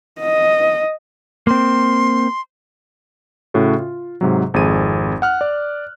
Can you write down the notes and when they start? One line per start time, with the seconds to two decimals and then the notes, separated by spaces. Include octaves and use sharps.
0.20 D#5
1.47 A#3 C4 C6
3.54 A2 C#3 C#4 F#4 A4
3.79 F4
4.21 G#2 C3 F#3
4.54 G#1 F2 G#4 D#7
5.22 F#5 F6 F#6
5.41 D5